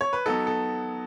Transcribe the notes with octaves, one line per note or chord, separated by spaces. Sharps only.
C#5
B4
F#3 B3 D#4 A4
A4